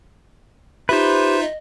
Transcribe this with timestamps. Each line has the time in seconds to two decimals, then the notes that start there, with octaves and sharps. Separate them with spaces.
0.89 D#4 F4 G4 B4 C5 E5
1.41 D#5